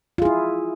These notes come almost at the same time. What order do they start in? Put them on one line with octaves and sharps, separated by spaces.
F4 G#4 E4